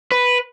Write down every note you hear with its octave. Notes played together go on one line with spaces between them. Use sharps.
B4